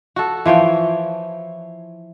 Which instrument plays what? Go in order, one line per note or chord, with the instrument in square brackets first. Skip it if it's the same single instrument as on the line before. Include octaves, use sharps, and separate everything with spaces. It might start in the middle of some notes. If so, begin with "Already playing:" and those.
[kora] F#4 A4
E3 F3 C#5 G5